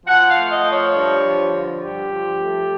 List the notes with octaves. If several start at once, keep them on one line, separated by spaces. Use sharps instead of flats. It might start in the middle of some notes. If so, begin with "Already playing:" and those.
F3 F#5
F5
A3
D#5
F3
C#5
G2
F3
D3
G2 G4
F3
A3